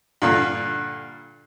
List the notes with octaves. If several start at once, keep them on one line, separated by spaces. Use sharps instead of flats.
G2 A#2 D3